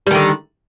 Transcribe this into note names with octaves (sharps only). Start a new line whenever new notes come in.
D3 D#3 G3